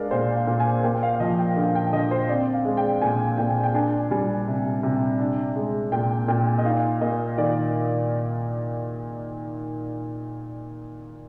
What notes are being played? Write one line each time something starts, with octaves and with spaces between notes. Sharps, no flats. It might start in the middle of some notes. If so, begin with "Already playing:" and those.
Already playing: G#3 D4 A#4 D5 F5
A#2 C5
F5
A#2
G#5
A#3 G5
F5
F5
F3 D#5
G5
D3 F5
G5
D3 D#5
C5
C4 D5
F5
G#3
G5
A#2 G#5
A#2 G5
G5
D4 G#5
G3 G#5
C3
C3
D4
G#3
A#2 G5
A#2 G5
D#5
D#4 F5
A#3 D#5
D#3 D5